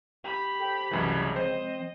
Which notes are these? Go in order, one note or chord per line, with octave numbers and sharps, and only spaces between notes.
G4 B5
A4 C5 G5
C2 F#2 C#3 E3 G#3
F3 C4 C5 D#5